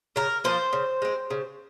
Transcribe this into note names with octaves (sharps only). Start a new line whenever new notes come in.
C#3 A#4
F3 A#3 C5
C#3
G#3 C4
C#3